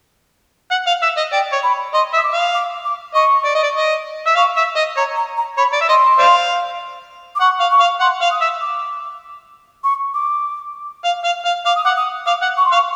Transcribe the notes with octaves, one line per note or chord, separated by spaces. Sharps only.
F#5
F5
E5
D#5
D5 G5
C#5
B5
D#5 C6
E5
D#6
D6
F5
D6
D6
D#5 C#6
D5
D#5
D5
D#5
E5
F5 C#6
E5
D#5
C#5 A#5
A#5
A#5
C#5 B5
D5
E5
D#5 C6
C5 D5 F5
D6
F#5 C#6
F5
C#6
F5
F#5 C6
F5
D#6
E5
D6
C#6
D6
F5
F5
F5
F5 D6
D#6
F#5 D6
D#6
F5 D6
F#5
C#6
C6
F5
C#6